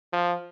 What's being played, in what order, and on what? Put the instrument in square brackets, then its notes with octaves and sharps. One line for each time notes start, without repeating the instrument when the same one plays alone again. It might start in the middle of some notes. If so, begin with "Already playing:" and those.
[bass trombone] F3